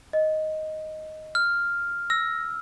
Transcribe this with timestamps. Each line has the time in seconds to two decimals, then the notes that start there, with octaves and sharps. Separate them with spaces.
0.13 D#5
1.35 F6
2.10 E6 A#6